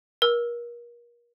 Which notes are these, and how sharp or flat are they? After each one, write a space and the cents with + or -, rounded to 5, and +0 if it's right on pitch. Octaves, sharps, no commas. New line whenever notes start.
A#4 +35 E6 +0